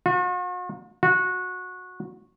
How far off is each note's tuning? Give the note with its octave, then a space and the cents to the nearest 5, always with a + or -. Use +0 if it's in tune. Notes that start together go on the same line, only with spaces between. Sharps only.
F#4 -45
F#4 -20